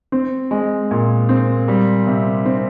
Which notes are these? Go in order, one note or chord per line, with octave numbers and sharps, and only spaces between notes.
C4
G#3
A#2
C4
G3
C3
C4